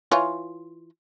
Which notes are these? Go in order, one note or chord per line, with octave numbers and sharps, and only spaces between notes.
E3 F4 C#5